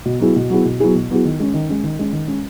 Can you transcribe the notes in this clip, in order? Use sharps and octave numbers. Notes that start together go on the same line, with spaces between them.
B2
F#3 B3 E4 G#4
B2
F#3 B3 E4 G#4
B2
F#3 B3 E4 G#4
B2
F#3 B3 E4 G#4
D#3
G#3 C#4
D#3
G#3 C#4
D#3
G#3 C#4
D#3
G#3 C#4